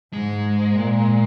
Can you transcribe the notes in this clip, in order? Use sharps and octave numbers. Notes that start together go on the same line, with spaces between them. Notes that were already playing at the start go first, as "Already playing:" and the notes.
G#2 G#3
A#2